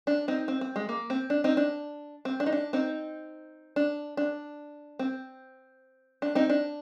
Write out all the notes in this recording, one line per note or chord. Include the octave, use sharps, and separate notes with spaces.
D4
C4 D#4
C4
C4
G#3
A#3
C4
D4
C4 D#4
D4
C4
D4
D#4
D4
C4 D#4
D4
D4
C4
D4
C4 D#4
D4